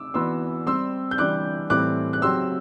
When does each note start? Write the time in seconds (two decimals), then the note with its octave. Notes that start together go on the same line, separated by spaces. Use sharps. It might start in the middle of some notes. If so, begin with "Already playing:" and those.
Already playing: D6 E6
0.14 E3 B3 F#4 C6 E6
0.67 G3 C4 G4 C6 E6
1.11 G6
1.18 E3 G3 D4 G4 D6 F#6
1.70 A2 E3 G3 C4 E4 D6 F#6
2.13 F#6
2.22 F#3 C4 G4 C6 E6